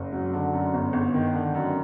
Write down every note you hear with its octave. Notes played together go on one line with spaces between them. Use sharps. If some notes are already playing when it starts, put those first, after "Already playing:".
Already playing: F#1
F#3
D3
F#2
G1
G1
D#3
D3
F#2